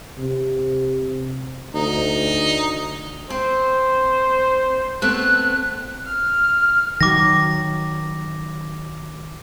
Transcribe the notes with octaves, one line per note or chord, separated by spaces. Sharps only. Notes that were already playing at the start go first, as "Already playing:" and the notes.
C3
D2 D#4
C4 C5
A3 B3 C4 F#6
F6
D#3 F#3 D6 A#6